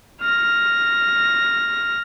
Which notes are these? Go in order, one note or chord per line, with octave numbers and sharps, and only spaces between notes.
F6 A#6